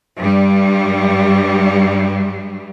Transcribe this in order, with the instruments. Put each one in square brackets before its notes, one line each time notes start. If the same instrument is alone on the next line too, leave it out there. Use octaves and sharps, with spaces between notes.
[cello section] G2 G3